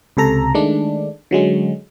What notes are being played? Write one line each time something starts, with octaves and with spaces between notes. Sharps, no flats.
C#2 C3 A4 A#5
D#3 G#3 A3 D4
D3 F#3 G#3 C#4